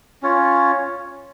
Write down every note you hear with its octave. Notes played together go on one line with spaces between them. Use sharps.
C#4 F4 C#5